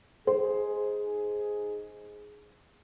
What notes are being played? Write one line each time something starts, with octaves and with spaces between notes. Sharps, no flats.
D#4 G#4 C5